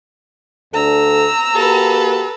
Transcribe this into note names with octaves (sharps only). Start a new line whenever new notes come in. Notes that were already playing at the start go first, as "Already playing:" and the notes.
D2 D4 A4 A#5 E6
A#3 F#4 G4 A4 B4